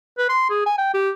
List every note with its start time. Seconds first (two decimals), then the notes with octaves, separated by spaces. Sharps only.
0.18 B4
0.30 C6
0.50 G#4
0.66 G#5
0.78 G5
0.94 G4